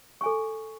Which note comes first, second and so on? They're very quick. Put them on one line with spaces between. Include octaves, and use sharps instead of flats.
C#6 G#5 A4